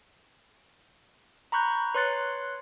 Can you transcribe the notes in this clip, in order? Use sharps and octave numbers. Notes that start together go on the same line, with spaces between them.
A#5 B5 C#6 F#6 G6
B4 C#5 C6 F#6 A6 C#7